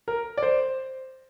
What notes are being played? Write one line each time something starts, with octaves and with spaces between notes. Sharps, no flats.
A#4
D5
C5